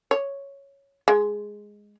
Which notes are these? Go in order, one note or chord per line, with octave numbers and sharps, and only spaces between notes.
C#5
G#3